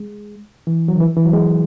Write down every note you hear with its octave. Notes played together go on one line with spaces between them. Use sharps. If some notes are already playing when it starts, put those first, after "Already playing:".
Already playing: G#3
E3
F#3
D#3
E3
E3
F#3
G#3